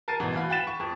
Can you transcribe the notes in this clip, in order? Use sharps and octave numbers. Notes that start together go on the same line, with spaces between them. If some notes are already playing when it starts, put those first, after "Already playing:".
A#4 A5 A6 C7 D#7
G#1 B2 E3
E3 F#4 F5 B5
F#5 G5 B5 A6 B6 E7
C#6
F2